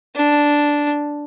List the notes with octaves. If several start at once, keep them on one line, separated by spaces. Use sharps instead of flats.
D4